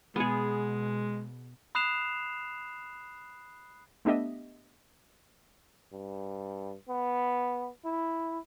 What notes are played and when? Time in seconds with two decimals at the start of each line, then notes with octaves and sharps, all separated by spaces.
0.16 B2 G#3 B3 G#4
1.75 B5 D#6 F#6 C7 E7 F7
4.05 A3 B3 D4 G4 D#5 E5
5.93 G2
6.89 B3
7.85 E4